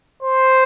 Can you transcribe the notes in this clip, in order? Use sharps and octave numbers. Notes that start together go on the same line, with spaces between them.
C5